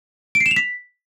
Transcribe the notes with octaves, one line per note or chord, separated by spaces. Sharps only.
D7
C7
E7
F7
B6